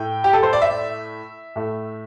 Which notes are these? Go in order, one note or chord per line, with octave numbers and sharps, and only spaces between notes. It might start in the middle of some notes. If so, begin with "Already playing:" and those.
Already playing: A2 A3 G5
G4
A4
C5
D5
E5
A2 A3